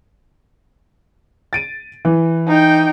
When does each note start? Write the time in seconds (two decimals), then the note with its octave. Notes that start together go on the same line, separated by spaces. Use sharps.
1.53 A6 D7 D#7
2.05 E3
2.48 D#4 G5